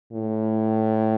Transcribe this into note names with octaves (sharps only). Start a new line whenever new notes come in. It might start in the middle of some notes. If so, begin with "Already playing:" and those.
A2